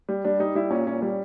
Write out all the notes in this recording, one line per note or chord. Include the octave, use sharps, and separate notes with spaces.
G3
G3 D4
G3 D#4
G3 E4
A#2 C#4
A#2 C#4
G3 C#4